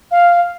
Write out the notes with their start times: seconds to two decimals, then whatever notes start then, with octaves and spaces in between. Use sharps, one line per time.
0.11 F5